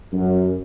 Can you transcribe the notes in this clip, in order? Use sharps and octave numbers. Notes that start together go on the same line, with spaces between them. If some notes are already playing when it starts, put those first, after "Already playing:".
F#2